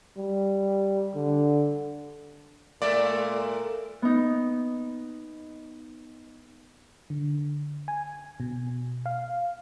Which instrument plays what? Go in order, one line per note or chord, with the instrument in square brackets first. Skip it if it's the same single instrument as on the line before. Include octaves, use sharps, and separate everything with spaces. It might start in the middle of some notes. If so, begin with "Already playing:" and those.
[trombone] G3
D3
[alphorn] A#2 [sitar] G#3 A3 E5 [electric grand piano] D5
[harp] B3 D#4
[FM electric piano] D3
G#5
B2
F5